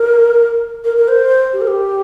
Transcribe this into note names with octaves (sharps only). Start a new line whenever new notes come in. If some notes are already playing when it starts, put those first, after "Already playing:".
Already playing: A#4
A#4
A#4
C5
G4
A#4
G4